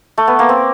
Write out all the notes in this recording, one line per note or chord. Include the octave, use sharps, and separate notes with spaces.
A3
B3
A#3
C4